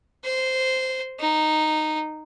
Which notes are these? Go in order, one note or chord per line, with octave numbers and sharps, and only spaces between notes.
C5
D#4